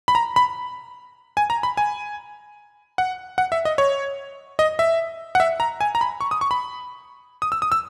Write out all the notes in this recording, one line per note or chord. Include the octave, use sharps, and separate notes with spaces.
B5
A#5
B5
G#5
A#5
B5
G#5
F#5
F#5
E5
D#5
C#5
D#5
E5
F#5
E5
A#5
G#5
A#5
B5
C#6
D#6
C#6
B5
D#6
E6
D#6
E6